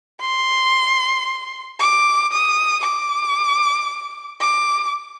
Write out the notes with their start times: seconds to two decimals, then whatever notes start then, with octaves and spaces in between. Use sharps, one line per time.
0.21 C6
1.79 D6
2.32 D#6
2.83 D6
4.41 D6